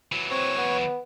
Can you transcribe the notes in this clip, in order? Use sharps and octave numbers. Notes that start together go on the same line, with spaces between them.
E3 F#3
C4 C#5 C#6
B3